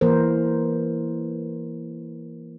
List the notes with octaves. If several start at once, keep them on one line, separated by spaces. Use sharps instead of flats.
E3 A#3 A#4 C5